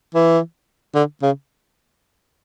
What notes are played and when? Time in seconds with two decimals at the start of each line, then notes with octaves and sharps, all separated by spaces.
0.15 E3
0.95 D3
1.22 C#3